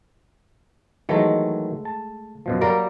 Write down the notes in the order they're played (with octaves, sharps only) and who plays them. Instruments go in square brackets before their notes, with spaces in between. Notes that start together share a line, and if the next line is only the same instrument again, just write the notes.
[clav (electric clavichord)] D#3 E3 F#3 [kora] G#3 A3
[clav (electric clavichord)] A5
F#2 B2 F3
[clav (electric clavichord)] F#3 [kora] G3 A#3 A#4